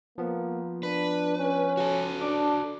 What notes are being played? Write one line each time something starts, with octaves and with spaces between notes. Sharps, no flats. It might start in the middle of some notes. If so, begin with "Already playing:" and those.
F3 A#3 B3
D4 B4
C#4
F#4 A4
D4 D6